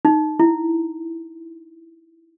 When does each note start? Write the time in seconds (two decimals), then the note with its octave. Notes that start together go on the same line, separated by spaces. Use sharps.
0.05 D#4
0.40 E4